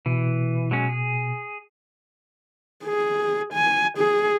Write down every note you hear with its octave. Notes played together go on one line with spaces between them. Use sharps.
B2 E3
F#3 G#3 C#4
G#4
G#4
G#5
G#4